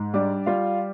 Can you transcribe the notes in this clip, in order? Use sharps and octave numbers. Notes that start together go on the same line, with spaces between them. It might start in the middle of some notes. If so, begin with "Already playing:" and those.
Already playing: G#2
G3 D4 D5
G3 F4 F5